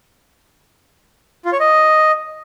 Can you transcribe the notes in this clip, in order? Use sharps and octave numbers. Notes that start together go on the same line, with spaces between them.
F4
C#5
D#5